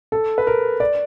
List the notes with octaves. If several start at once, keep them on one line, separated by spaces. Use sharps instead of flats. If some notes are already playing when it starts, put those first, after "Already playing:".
A4
B4
A#4
D5